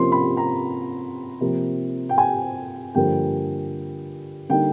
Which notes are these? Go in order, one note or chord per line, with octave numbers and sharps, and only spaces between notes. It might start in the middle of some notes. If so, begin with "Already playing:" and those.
Already playing: C3 F3 A#3 C#4 F4 C6
B5
A#5
C3 F3 A#3
G5
G#5
G2 D3 F3 A#3 G5
D3 G3 A#3 D#4 G5